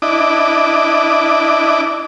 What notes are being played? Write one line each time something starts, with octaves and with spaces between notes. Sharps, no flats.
D4 E4 D#5 D6